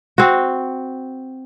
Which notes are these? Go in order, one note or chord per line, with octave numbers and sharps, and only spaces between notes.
C4 F#4